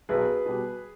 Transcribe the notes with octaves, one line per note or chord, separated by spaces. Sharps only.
B1 G#4 B4
B2 G3